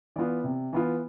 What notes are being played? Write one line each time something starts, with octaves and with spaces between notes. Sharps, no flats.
E3 B3 F4 D5
C3
E3 B3 F4